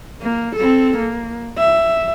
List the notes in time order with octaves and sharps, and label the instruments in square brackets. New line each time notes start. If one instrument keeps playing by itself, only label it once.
[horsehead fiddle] A#3
C4 A4
A#3
E5